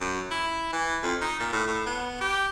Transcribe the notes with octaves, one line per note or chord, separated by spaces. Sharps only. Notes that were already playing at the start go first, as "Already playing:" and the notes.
F#2
E4
E3
F2
D#4
A#2
A2
A2
B3
G4